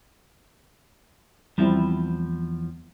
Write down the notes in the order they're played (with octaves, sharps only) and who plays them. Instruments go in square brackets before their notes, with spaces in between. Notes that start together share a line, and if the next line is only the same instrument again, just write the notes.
[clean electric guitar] E2 F3 [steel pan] G3 C4 E4